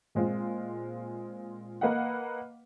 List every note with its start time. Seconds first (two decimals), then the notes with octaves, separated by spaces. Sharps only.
0.15 A#2 G#3 C4 F4
1.81 A#3 B4 D#5 F5 F#5